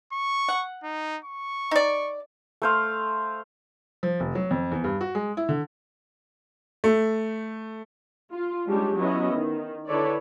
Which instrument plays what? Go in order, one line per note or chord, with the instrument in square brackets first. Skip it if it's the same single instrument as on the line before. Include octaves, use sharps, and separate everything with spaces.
[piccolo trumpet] C#6
[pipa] F#5
[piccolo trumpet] D#4
C#6
[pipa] D#4 D5
[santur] A3 C5 F5
[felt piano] F3
F1
F#3
F2
E2
G2
F#4
G#3
E4
D3
[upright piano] A3
[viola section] F4
G3 G#3 C#4 D4 G4
F#3 B3 C#4 E4 D#5
D#3
D3 E4 A4 B4 C#5 D5